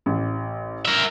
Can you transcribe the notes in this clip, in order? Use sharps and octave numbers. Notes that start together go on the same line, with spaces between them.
A1
A#4 E5